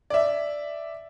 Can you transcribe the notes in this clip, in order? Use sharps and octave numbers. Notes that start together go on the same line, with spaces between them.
D5 E5